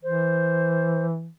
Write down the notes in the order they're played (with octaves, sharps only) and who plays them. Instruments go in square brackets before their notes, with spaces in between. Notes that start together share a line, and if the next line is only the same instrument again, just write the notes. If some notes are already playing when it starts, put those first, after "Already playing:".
[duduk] E3 [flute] C5